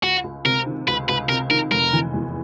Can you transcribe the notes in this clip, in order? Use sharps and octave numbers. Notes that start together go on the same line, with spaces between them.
C#2 F#4
C#2
C3 A#4
D#3
C#2 B4
C#2 B4
C3 A#4
D#3 A#4
F1 A#4
E3
E2